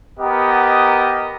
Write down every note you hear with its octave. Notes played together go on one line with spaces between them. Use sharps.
B3 G4 A#4 D#5